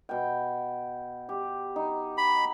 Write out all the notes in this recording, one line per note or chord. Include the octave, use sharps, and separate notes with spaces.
B2 G5
G4
D#4
B5